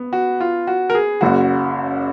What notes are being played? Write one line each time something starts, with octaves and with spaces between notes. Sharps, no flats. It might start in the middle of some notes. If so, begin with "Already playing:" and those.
Already playing: B3
F#4
F4
F#4
A#4
G#4
F#1 F#2 C#3 F#4